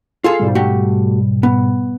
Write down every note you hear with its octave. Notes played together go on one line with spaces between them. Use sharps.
F4 G#4 A4 F5
G#2 B2 G3
A3 F#4 G4
B3